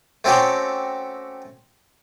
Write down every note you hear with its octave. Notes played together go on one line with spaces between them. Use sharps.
A3 C4 C#4 F#4 G4 A4